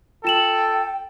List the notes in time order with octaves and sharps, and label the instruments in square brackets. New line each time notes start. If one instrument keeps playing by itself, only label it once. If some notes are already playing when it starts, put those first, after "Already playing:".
[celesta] F4 E7 F#7 [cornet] A4 [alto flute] G5